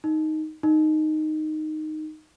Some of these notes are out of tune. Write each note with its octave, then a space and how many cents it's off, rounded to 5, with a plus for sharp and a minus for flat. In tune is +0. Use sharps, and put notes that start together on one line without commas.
D#4 +5
D#4 -5